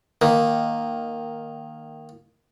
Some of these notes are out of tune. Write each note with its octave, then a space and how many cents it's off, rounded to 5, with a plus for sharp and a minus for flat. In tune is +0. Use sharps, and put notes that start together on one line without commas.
D#3 +0 A#3 +0